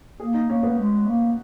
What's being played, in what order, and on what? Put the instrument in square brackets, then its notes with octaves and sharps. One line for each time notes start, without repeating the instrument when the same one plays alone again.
[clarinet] A#3 [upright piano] G#4
[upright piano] D#4
[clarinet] A#3 [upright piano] C#4
[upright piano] B3
[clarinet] G#3
A#3